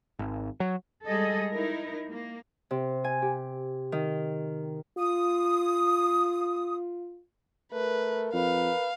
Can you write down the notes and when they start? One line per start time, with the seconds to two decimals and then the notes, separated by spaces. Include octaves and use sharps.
0.19 G#1
0.60 F#3
1.05 G3 G#3 G#4 A4 D#5
1.52 D#4 E4 A#4
2.09 A#3
2.71 C3
3.04 G#5
3.22 G4
3.92 D#3
4.98 F4 D#6
7.72 A3 A#4 B4
8.34 F2 B4 F5